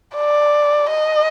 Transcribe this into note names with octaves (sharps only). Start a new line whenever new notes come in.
D5
D#5